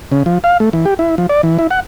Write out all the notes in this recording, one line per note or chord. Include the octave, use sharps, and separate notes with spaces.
C#3
F3
F5
A3
E3
G4
E4
F3
D5
E3
E4
F#5